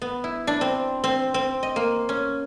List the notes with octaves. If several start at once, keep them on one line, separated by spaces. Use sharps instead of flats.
B3
E4
D4
C4
C4
C4
D#5
A#3
C#4